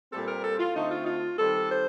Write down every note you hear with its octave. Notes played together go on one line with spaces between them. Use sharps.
A#2 G3 C4 A4
A#4
A4
F4
D3 A3 C4 D#4
F4
D#4
F4
D#3 G3 C4 A4
C5